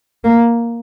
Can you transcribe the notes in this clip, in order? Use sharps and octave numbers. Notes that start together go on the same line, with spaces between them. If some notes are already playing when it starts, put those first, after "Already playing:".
A#3